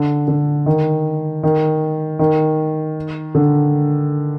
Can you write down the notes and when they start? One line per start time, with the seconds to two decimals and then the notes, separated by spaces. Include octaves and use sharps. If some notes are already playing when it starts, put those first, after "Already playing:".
Already playing: D3
0.28 D3
0.66 D#3
1.43 D#3
2.19 D#3
3.35 D3